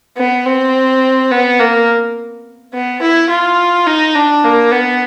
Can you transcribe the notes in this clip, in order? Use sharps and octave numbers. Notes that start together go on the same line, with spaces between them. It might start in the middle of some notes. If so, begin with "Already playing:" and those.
B3
C4
B3
A#3
B3
E4
F4
D#4
D4
A#3
B3